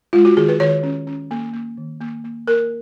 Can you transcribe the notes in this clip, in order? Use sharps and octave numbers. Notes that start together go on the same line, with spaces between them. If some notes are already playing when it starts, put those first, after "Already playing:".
G#3 F4
F#4
D#3 G#4
B4
D#3 C#5
C#4
C#4
A#3
A#3
D#3
A#3
A#3
A#3 A#4